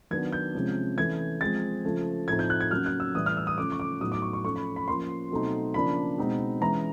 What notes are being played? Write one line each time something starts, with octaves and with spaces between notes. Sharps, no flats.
D#3 F#3 B3 D4 G#6
G6
C3 F3 G#3 C#4
E3 A3 C#4 G#6
F3 G#3 C4 A6
C#3 F3 A3
A2 F3 A3 C4 D#4 G#6
G6
F#6
G#6
C#3 F#3 A#3 C#4 F6
F#6
E6
A2 E3 G3 D#6
F6
E6
D#6
C#3 F3 A3 C#4 D6
C#6
D6
A2 F#3 B3 D#4 D#6
D6
C#6
C#6
F3 A3 C#4 C#6
B5
B5
F3 A#3 C#4 C6
B2 F#3 A3 C4 D#4
C#3 F3 A#3 D4 B5
B2 G#3 C4 D#4
E3 G#3 C#4 A#5